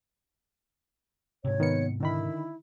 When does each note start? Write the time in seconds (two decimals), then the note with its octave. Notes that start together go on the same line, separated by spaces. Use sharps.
1.45 G#2 C3 C#5
1.60 D#3 B3 C#7
2.00 D3 D#3 E4 B5